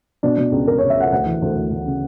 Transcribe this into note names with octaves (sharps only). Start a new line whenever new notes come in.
B2 D4
B2
C#2
C#2 A#4
C#5
C#2
E5
C#2 F#5
D2 F#5
E3
D2
D2
D2
C#3